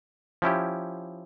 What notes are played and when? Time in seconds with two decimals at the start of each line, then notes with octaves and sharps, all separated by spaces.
0.42 F3 C#4 E4 G4